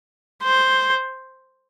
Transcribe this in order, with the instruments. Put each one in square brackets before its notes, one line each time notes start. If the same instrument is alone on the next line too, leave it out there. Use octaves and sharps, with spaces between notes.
[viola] C5